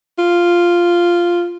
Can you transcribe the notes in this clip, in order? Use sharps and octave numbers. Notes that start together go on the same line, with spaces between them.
F4